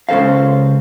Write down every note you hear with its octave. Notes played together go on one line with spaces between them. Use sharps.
C#2 C#3 A4 C5 F5